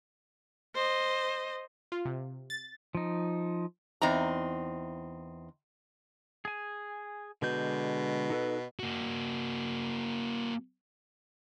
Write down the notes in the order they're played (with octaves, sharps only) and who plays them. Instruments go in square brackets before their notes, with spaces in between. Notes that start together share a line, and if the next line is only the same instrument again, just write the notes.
[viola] C5 D#5
[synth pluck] F4
C3
A6
[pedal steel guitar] F3 D#4
[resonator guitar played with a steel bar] E2 C4 D#4 A#5
[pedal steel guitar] G#4 G#5
[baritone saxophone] B2 [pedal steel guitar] D3 G#3 G6
[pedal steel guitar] D#4 A4 B4
[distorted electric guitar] A#3 F#4